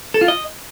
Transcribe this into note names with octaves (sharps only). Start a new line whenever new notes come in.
A4
F4
D#5